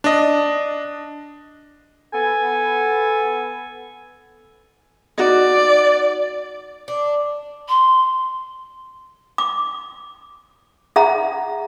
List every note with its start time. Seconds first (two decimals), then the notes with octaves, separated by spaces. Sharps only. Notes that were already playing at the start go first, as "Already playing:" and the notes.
0.04 D4 D#5
2.13 B3 A4 G#5
5.18 D#4 F#4 D5 D#5
6.88 D4
7.69 C6
9.38 D6
10.96 G#4 E5 F#5 A#5